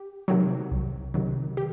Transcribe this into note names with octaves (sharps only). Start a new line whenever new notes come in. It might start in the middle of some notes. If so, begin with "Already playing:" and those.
Already playing: G4
C3 D#3 F#3
C2
C3 D#3 F#3
G4